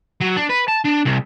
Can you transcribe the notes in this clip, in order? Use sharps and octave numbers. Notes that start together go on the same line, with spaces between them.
F#3
D4
B4
A5
D4
C2